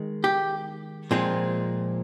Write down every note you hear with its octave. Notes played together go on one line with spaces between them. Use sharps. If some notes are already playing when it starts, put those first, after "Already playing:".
Already playing: D#3 G#3
G4
A#2 F3 G#3 C4